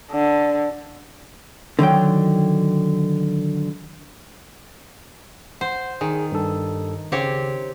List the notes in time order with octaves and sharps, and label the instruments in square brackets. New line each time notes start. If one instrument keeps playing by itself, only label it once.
[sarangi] D3
[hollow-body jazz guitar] D3 D#3 F#3 G5
[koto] C5 [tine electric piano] F#5
[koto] D#3 [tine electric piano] G#4
[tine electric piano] G2 A4
[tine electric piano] C#3 [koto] C4 G4 C#5